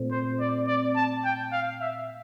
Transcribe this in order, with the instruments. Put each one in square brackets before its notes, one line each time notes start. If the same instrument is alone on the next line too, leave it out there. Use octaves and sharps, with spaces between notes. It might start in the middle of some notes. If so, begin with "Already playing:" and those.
Already playing: [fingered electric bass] A#2 A3 C4
[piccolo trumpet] C5
D5
D5
A5
G5
F5
E5